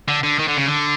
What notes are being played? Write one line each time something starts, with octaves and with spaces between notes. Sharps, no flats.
D3
D3
D#3
D3
C#3
D3